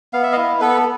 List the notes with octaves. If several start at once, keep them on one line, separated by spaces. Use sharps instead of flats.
B3 F5
E5
E4 D#5 F5
B3 A4 B4